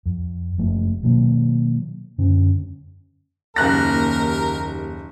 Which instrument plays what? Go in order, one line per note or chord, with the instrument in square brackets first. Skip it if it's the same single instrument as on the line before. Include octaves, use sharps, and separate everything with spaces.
[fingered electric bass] F2
F#1 F3 A3
B2 D#3 F#3 A#3
F#2 D3 C#4
[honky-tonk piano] F#1 F#6 A#6 [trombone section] D#2 [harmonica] A#4